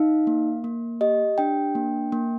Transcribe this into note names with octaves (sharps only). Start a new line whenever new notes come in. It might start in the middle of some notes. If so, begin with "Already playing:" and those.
Already playing: D#4 F5
A#3
A#3
G4 D#5
D4 G5
A#3
A#3